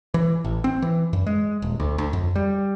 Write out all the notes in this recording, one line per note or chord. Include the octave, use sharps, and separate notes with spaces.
E3
A1
C4
E3
F#2
G#3
D#1
D2
D2
F2
G3